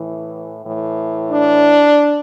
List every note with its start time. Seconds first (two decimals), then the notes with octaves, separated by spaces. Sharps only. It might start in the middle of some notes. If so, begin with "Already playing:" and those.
Already playing: A2 E3
0.65 A2 E3
1.29 D4